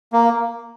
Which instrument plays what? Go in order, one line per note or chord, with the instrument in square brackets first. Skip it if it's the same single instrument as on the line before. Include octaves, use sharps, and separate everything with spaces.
[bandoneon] A#3